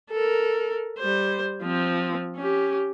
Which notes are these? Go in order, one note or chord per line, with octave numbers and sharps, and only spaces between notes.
A4 A#4
G3 C5
F3 C4
C#4 G4